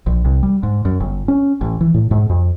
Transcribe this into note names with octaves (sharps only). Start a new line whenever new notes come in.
A#1
C2
G3
G#2
F#2
G1
C#4
A1
E3
A2
G#2
F2